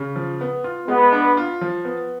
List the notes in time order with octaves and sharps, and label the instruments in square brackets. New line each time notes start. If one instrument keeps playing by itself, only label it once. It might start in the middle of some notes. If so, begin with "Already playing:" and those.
Already playing: [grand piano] C#3
F3
B3
F4
[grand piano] G#3 [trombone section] B3
[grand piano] D4
F4
F3
B3